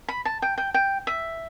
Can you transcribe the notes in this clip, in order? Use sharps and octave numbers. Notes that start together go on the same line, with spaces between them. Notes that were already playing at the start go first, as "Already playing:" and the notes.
B5
A5
G5
G5
G5
E5